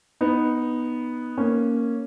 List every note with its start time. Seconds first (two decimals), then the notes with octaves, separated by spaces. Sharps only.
0.21 B3 D#4
1.38 A#3 C#4